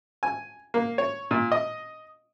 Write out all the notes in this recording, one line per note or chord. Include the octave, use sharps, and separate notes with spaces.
G#5
A#3
C#5
A#2
D#5